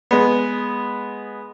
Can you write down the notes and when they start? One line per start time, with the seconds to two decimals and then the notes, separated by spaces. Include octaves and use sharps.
0.11 G#3 B3